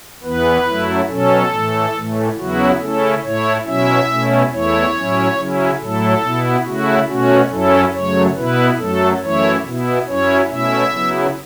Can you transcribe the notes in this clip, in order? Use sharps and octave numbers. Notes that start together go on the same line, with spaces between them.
E2 E3 B3 B4
F#2 F#3 A3 E4
B2 F#3 C#4 A4
A2 E3 A3
A2 E3 A3
E2 C#3 F#3 B3 E4 F#4
C#3 A3 C#4 E4 A4
A2 A3 E4 C#5
B2 F#3 C#4 E4 E5
B2 A3 C#4 E4
E2 E3 A3 E4 C#5
A2 F#3 C#4 E4
C#3 F#3 C#4 E4
A2 F#3 A3 E4 A4
B2 B3 E4
C#3 A3 E4 F#4
B2 A3 C#4 F#4
F#2 F#3 C#4 E4 A4
F#2 C#3 F#3 A3 C#5
B2 B3 E4 B4
F#2 F#3 A3 A4
F#2 E3 A3 E4 C#5
B2 B3 E4
F#2 F#3 C#4 E4 C#5
B2 A3 C#4 E4 E5
C#3 F#3 B3 E4